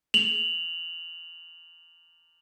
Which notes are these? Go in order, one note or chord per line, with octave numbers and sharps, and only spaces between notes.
F7 F#7